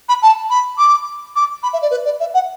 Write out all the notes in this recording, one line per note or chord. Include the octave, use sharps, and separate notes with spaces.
B5
A5
B5
D6
D6
B5
E5
D5
B4
D5
E5
F#5